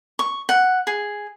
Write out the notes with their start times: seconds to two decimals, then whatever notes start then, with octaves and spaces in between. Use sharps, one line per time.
0.19 C#6
0.49 F#5
0.87 G#4